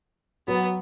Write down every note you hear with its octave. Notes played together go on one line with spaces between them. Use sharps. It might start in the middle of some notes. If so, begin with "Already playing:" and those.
F#3 B3